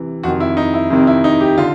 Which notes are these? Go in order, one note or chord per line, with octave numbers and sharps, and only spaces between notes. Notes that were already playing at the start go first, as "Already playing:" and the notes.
Already playing: C3 E3
F2 C3 D#3 F#4
E4
D#4
E4
F2 C3 D#3 E4
E4
D#4
G4
D3 F4